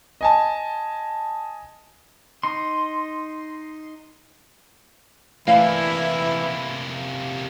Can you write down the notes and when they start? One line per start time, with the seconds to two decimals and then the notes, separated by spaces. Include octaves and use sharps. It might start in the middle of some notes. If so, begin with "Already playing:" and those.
0.21 D#5 G#5 A5
2.43 D#4 C6
5.47 C3 E3 A3 A#3 E4 D5 F5